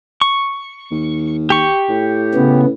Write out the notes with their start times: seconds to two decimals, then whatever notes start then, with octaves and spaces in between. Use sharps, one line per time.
0.21 C#6
0.91 D#2
1.50 G4 C#6
1.89 A2
2.35 C#3 B3